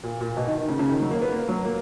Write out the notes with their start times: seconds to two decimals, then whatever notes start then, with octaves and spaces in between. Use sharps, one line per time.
0.03 A#2
0.21 A#2
0.37 B2
0.47 D#3
0.57 D#3
0.68 C#3
0.79 C#3
0.89 D#3
1.01 F#3
1.11 A#3
1.22 B3
1.32 A#3
1.49 F#3
1.65 A#3